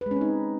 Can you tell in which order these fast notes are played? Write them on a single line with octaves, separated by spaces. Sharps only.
B4 G#3 C#4 C4 D#4